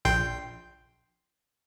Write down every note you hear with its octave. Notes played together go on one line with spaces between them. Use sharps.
A#1 G5 C6